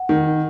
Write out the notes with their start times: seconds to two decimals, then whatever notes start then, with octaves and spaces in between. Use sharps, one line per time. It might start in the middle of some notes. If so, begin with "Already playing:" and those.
Already playing: F#5
0.09 D#3